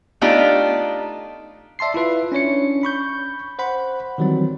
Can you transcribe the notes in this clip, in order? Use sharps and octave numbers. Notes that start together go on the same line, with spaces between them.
A3 B3 D4 D#4 F4 G4
D5 E5 A5 C6 C7
E4 F4 B4 E5
C#4 D4 C#5 C#7
B5 C#6 G6
C5 F#5 B5
D#3 E3 F#3 G3 C4